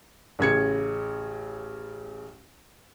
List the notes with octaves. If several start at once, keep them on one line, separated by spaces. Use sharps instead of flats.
A1 C#3 G#6 C#7